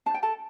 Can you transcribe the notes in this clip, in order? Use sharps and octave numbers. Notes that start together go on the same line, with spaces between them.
D4 A5
G5
A4 A5